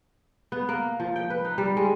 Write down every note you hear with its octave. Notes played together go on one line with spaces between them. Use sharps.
B3
A#3
F3
G5
B4
D#4
G3
G#3